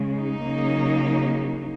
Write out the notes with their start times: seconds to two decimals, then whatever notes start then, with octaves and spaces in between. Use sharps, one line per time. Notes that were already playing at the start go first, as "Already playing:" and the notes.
Already playing: C#3 G#3
0.15 D#4
0.44 C#3 F#3 A#3